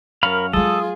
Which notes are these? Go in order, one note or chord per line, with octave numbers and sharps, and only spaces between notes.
F#2 A#4 C#5 F5 A#5 B5
F#3 G#3 F4 G#4 A4 D#6